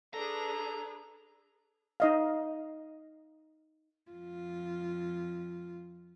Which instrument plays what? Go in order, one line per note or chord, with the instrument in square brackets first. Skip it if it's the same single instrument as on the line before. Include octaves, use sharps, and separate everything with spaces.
[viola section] D4 G#4 B4 [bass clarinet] A4 [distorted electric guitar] A#5
[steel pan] D#4 D#5 F5
[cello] F2 F4